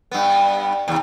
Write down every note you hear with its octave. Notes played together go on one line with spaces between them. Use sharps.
G2 B3
D#2 C3